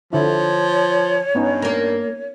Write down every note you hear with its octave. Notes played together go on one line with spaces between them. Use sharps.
D3 F3 E4 C#5
G2 B3 C#4 D#4
A#3 A#4